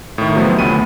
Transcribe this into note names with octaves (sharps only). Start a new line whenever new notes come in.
A2 D#3
C3 F3 F#3 A3 B3
D2 B3 B5 D#7